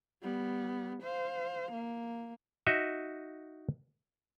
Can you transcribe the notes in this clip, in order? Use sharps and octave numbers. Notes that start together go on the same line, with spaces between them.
G3 B3
C5 F5
A#3
D#4 F#4 D#5 E5